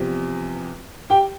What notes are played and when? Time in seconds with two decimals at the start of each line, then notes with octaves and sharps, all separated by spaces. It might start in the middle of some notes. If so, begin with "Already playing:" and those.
Already playing: E2 C3 F3
1.10 G4 G5